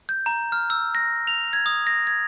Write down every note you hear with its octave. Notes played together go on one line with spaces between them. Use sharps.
G6
A#5
F6
E6
A#6
F7
G#6
D#6
A#6
G#6